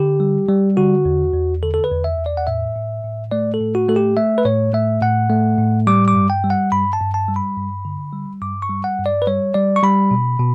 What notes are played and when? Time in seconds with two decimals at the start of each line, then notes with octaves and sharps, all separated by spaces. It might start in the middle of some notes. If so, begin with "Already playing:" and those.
Already playing: D3 G4
0.20 G3
0.49 G3
0.77 D3 F#4
1.05 E2
1.33 E2
1.63 D3 A4
1.74 A4
1.84 B4
1.91 E2
2.04 E5
2.18 E2
2.26 D5
2.37 F#5
2.47 A2 E5
2.76 A2
3.04 A2
3.31 A3 D5
3.54 A4
3.61 A2
3.75 F#4
3.89 A3 A4
3.96 G4
4.17 A3 E5
4.38 B4
4.45 A2 C#5
4.73 A3 E5
5.02 A2 F#5
5.30 A3
5.58 A2
5.87 G3 D6
6.08 D6
6.15 G2
6.30 G5
6.44 G3
6.50 F#5
6.72 G2 B5
6.93 A5
7.00 G2
7.14 A5
7.28 G3
7.36 B5
7.57 G2
7.85 D3
8.13 G3
8.41 G2 D6
8.62 C#6
8.70 G3
8.84 F#5
8.99 G2
9.06 D5
9.22 B4
9.27 G3 C#5
9.54 G3 D5
9.76 C#6
9.83 G3 B5
10.11 B2
10.40 B2